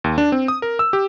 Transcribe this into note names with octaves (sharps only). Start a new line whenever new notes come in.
D#2
D4
C4
D#6
A#4
E6
G4